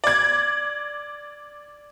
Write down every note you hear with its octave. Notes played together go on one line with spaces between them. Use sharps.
D5 G#6